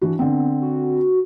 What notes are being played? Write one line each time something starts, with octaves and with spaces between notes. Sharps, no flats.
E3 D4 F#4
D3 B3 C4
F#4